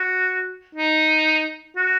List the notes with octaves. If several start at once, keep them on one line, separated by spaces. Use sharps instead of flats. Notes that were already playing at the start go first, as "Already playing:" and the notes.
Already playing: F#4
D#4
F#4